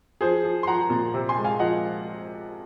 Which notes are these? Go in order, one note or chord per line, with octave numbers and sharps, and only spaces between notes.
F3 G#4 C5
F3
C6
F3 F#5 A#5
A#2
C3
G#5 C6
G#3
F5 G#5
F3 D#5 F#5